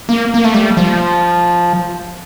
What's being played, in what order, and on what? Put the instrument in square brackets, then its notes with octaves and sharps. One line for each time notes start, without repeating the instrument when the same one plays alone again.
[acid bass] A#3
A#3
A3
G3
F3